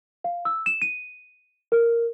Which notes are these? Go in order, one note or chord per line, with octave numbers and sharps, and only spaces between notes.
F5
E6
E7
D#7
A#4